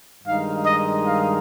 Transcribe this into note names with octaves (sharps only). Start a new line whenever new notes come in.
G2 D#3 G#3 D#4 F5
D#5
F5